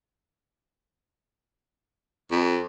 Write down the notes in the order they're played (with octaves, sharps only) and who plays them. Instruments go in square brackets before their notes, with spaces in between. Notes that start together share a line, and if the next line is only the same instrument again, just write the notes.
[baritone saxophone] F2